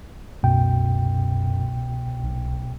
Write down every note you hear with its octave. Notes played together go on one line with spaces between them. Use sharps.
C2 F#2 B2 G5
B1